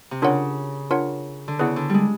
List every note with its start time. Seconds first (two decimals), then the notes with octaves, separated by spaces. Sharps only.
0.11 C3
0.22 C#3 D4 F4 A#4 C#5 F#5
0.91 D4 F4 A#4 C#5 F#5
1.48 D3
1.59 C#3 B3 E4 G#4 B4 D5
1.76 D3
1.90 G3 G#3